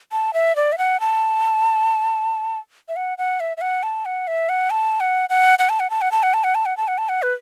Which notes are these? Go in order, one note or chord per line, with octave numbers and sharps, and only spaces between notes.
A5
E5
D5
E5
F#5
A5
E5
F#5
F#5
E5
E5
F#5
A5
F#5
E5
F#5
A5
F#5
F#5
F#5
A5
F#5
A5
F#5
A5
F#5
A5
F#5
A5
F#5
A5
F#5
A5
F#5
B4